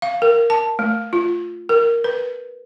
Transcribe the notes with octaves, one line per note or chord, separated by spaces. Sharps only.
F5
A#4
A5
A3
F4
A#4
B4